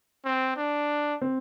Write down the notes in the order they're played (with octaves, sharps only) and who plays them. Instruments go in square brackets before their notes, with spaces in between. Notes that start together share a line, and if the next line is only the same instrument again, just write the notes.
[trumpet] C4
D4
[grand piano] C4